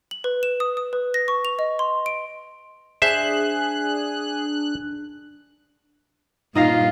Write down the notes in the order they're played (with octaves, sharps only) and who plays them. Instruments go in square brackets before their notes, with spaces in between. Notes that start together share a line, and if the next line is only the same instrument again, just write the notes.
[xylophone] F#7
B4
E7
D#6
D#6
B4
A#6
C#6
F7
D#5
C6
D7
[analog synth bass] D4 [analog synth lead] G#4 [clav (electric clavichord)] C5 E5 [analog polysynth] F#6
[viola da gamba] G2 A#2 F4 [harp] D#4 D#5 F5